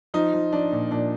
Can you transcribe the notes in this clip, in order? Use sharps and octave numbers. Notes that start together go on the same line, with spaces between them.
F3 D#4
F3
F3 D4
A#2
A#2 D4